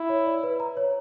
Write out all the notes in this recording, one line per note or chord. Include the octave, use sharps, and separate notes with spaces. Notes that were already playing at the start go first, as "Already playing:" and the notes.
Already playing: E4
C#5
D5
B4
A#5
C#5